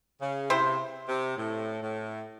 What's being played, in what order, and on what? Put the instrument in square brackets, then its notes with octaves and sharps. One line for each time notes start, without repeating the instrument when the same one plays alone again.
[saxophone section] C#3
[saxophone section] C3 [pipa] C4 E4 C5
[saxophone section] C3
A2
A2